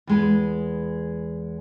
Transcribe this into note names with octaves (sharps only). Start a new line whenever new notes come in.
E2 G#3 B4